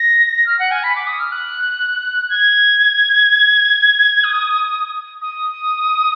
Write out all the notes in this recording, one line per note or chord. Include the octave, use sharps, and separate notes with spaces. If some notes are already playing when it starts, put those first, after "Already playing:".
Already playing: A#6
A#6
F6
F#5
G#5
B5
D6
D#6
F6
F#6
G#6
D#6
D#6